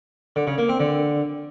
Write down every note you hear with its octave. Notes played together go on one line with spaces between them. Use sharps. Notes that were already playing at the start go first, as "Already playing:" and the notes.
D3
C#3
A#3
C4
D3